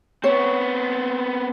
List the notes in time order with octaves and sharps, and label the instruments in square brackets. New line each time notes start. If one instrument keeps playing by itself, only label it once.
[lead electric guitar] B3 C4 [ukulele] C#5